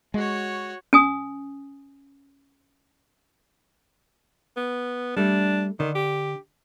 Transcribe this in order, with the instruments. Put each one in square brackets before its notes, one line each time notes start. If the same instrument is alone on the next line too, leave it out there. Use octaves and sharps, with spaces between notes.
[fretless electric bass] G#3 [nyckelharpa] F#4 C#5
[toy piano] C#4 G#5 D#6
[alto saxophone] B3
[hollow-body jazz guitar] G3 A3 [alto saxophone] D4
[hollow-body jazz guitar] D3 [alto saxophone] D#3
[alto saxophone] G4